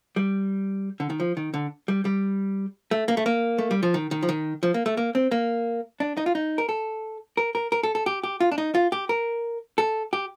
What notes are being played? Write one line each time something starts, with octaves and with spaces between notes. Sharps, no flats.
G3
D3
D#3
F3
D#3
D3
G3
G3
A3
A#3
A3
A#3
A3
G3
F3
D#3
D#3
F3
D#3
F3
A#3
A3
A#3
C4
A#3
D4
D#4
F4
D#4
A#4
A4
A#4
A#4
A#4
A4
A4
G4
G4
F4
D4
D#4
F4
G4
A#4
A4
G4